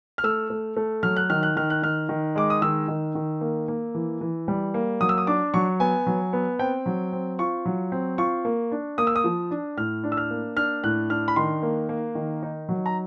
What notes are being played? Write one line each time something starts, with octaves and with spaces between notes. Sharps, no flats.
F6
A3 E6
A3
A3
F#3 F6
F#6
D#3 F6
F#6
D#3 F6
F#6
D#3 F6
D#3
G#3 D6
D#6
D#3 E6
D#3
D#3
A#3
A#3
E3
E3
G3
A#3
F#3 D#6
E6
D#6
D4 D6
F#3 C#6
B3 G#5
F#3
B3
C4 G5
F#3
C4
F4 C#6
F#3
C4
F4 C#6
A#3
D4
A#3 D#6
E6
D#6
F3
D4
A2 F6
D4
E6
F6
A#3
D4 F6
A2 F#6
D4 F6
B5
D#3 C6
A#3
A#3
D#3
D#4
F#3
A#5